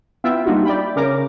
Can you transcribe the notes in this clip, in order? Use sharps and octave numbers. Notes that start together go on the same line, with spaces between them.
B3 E4 F4 E5 G5
G3 A#3 D4 D#4 F4 F#4
D5 E5 G5 B5
C#3 C#4 A#4 D6 A#6